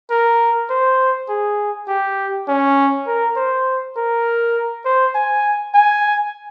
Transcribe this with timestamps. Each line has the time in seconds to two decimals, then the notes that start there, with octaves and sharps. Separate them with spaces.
0.10 A#4
0.69 C5
1.29 G#4
1.88 G4
2.48 C#4
3.07 A#4
3.36 C5
3.96 A#4
4.85 C5
5.15 G#5
5.74 G#5